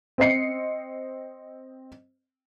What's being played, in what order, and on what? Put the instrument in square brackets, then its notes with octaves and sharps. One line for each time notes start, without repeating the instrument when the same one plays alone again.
[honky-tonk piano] C4 D#5 C7 C#7